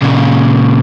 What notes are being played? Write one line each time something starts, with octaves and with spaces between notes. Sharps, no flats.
A#2 C#3